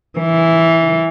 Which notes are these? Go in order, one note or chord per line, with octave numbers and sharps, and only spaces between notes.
E3